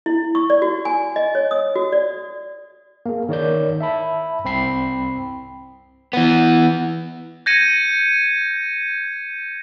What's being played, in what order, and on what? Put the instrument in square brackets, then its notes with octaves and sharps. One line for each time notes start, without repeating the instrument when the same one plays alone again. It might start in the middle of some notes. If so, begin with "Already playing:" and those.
[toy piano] E4
C#6
D5
F#4
G#5
D#5
C#5
D#6
F#4
D5
[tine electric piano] A#3 G#4
D#3 C#5 D5 G6
E5 A5 B5
C2 C4 G5 B5 C7
[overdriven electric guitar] E3 B3
[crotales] G6 G#6 A#6 C#7 D#7